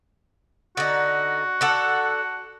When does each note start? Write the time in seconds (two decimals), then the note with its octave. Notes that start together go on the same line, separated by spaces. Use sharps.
0.77 D3 D#4 F#4
1.61 D4 A4 F#5